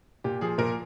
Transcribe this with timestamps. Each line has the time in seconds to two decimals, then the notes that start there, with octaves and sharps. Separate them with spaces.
0.24 A#2 G4
0.41 F3 G#4
0.58 A#2 A#4